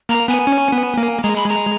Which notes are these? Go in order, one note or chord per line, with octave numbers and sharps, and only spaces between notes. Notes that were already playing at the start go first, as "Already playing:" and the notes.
A#3 A#5
B3 G#5
C#4
B3
A#3
G#3 A#5
B5
A#5